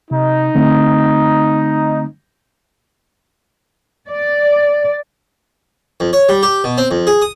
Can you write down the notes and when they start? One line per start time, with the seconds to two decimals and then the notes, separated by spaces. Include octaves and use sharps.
0.11 C3 D#4
0.55 D3 A3 C4
4.07 D5
6.00 F2
6.13 C#5
6.29 G3
6.43 G4
6.64 B2
6.78 C4
6.91 F2
7.07 G#4
7.22 D#6